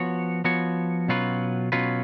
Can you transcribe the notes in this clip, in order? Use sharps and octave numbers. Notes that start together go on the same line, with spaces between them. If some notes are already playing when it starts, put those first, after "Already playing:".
Already playing: F3 B3 F#4 C#5
F3 B3 F#4 C#5
B2 F#3 C#4 F4 B4
B2 F#3 C#4 F4 B4